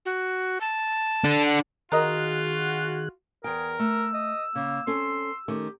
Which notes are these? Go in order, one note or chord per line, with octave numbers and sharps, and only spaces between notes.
F#4
A5
D4 A4
F#5
D#3 F4 F#4 G#4 A#4 D#5 F#6
E2 G#4 A#4 G5
A3 E6
D#5
C#3 A#3
C4 C#4 A4 C6
D#3 A3 C#4 G4